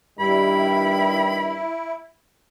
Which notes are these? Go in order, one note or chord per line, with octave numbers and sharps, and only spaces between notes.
G2 D#3 G3 E4 B5